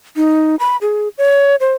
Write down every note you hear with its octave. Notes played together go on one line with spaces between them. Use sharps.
D#4
B5
G#4
C#5
C5